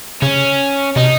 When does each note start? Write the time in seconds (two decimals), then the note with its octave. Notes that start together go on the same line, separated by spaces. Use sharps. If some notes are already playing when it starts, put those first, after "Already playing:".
0.22 C#3 C#4
0.96 C3 D#4